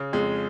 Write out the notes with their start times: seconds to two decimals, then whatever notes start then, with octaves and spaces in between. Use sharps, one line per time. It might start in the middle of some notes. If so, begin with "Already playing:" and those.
Already playing: C#3
0.13 F2 G#3